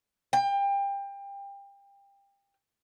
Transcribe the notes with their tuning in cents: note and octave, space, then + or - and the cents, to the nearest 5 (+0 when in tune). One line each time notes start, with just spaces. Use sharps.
G5 +25